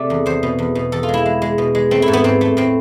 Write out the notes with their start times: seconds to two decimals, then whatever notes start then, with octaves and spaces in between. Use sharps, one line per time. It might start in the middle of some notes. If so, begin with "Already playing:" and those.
Already playing: C3 A3 D5 E5
0.10 E2
0.26 E2 C5
0.43 B2
0.59 E2
0.75 B2
0.92 E2 A4
1.03 F4
1.09 G#3
1.14 E4
1.26 G#3
1.42 G#3
1.58 B2
1.75 G#3
1.91 A3 C4
2.02 E4
2.08 G#2
2.13 B3
2.24 G#2 C4
2.41 A3
2.57 A2 C4